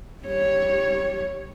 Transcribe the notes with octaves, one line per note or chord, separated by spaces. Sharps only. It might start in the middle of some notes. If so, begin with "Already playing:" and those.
G3 C#5